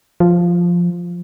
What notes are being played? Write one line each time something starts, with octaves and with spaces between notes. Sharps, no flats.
F3